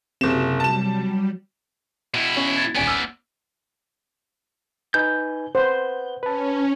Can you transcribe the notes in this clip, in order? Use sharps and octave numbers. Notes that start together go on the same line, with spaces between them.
F#1 C3 F#4 E7
F#3 G3 A5 E7
B2 E4
C#4
G#6 A6
D#1 B3 C#4 D5 G#5
E6 F6
D#4 B4 G#5 G6
B4 C5 F#5
C#4 B4 A5